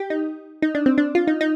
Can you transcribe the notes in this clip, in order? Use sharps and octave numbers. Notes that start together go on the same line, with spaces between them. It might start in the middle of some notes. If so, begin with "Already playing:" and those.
Already playing: G4
D#4
D#4
D4
C4
D4
F4
D#4
D#4